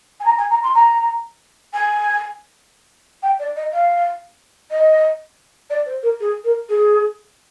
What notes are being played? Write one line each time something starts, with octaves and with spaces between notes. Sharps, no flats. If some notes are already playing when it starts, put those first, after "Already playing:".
G#5
A#5
G#5
A#5
C6
A#5
G#5
G5
D5
D#5
F5
D#5
D5
C5
A#4
G#4
A#4
G#4